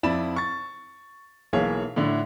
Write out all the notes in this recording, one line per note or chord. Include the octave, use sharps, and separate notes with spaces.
F2 E4 D5 B5 E7
C#6 A6
B1 E3 A#3 G#4 C#5
A2 D3 D4 E4